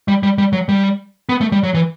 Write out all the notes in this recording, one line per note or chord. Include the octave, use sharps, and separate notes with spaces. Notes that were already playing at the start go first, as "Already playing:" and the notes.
G3
G3
G3
F#3
G3
B3
A3
G3
F#3
E3